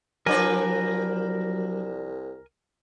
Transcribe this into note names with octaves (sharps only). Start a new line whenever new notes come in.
C2 F3 F#3 D4 A#4 B4 G#5